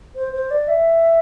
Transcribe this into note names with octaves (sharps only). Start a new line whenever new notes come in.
C5
C5
D5
E5